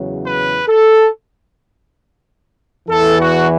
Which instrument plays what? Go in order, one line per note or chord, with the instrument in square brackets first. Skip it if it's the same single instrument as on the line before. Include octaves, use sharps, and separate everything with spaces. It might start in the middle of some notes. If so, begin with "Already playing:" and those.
Already playing: [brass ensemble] E2 C#3 F#3
B4
A4
E2 E3 A4
F#4